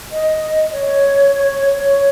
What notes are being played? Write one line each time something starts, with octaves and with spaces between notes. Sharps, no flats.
D#5
C#5
C#5
C#5